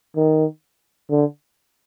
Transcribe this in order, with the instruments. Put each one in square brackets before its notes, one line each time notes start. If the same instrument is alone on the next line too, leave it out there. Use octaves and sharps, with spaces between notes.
[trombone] D#3
D3